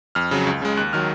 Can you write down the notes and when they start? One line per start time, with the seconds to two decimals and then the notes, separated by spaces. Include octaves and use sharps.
0.15 F2 F6
0.31 C#3 F#3
0.47 C#2
0.62 C#3 G#3
0.77 D#2 F#6
0.93 D#3 F#3 F6